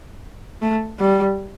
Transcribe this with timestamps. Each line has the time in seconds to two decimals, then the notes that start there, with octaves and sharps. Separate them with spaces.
0.62 A3
0.99 G3